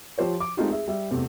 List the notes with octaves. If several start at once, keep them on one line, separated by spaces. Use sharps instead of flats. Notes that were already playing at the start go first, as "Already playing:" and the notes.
F3 G4 C5 C#5
D6
G#3 A3 C4 D#4 F4 G4
G#4 E5
G3 E5
E2 C3 A3 C4